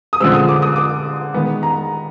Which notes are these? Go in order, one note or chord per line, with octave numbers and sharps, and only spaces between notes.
D#6
D3 F3 G#3 C4 E6
D#6
D6
D#6
D6
D#3 G#3 B3
A#5